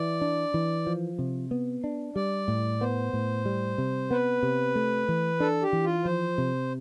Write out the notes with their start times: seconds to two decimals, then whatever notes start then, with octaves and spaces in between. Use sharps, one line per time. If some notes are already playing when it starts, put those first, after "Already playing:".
Already playing: E3 D5
0.21 D4
0.54 E3
0.87 F3
1.19 C3
1.51 B3
1.84 D4
2.16 G3 D5
2.48 A2
2.81 B3 C5
3.13 A2
3.45 G3
3.78 C3
4.11 B3 B4
4.43 C3
4.75 A3
5.08 E3
5.40 D4 A4
5.62 G4
5.73 E3
5.84 F4
6.05 F3 C5
6.38 C3